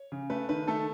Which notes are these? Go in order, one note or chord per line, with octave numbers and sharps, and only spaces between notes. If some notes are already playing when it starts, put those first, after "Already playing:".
Already playing: C#5
C#3
A3 B4
D#3 B4
A3 A4